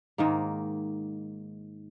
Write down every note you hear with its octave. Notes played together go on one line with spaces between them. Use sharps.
G#2 D#3 A#3